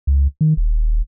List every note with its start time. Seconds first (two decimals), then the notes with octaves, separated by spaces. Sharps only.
0.07 C#2
0.41 D#3
0.57 D#1